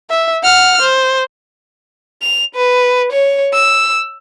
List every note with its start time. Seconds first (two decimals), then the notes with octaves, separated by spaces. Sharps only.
0.10 E5
0.43 F#5 F6
0.82 C5
2.22 F7
2.55 B4
3.12 C#5
3.54 E6